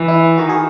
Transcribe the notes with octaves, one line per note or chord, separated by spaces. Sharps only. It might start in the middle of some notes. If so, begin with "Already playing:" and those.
Already playing: E3
E4
D#3 F#4
G#4